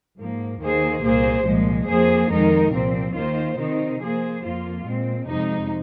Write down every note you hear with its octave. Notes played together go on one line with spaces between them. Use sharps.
G#2 F3 A#3
D#2 D#3 A#3 G#4 C5
C2 A#2 A#3 G#4 C5
C2 A#2 F3 G#3
F2 F3 A#3 G#4 C5
F2 D#3 G#3 D#4 A#4
C2 A#2 F3 C4
D#2 D#3 A#3 F4 C5
C3 D#3 C4 D#4
F3 A#3 G#4 C5
F2 F3 A#3 F4
A#2 G#3 C4
F2 C3 G#3 D#4